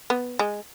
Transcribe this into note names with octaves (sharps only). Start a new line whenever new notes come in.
B3
G#3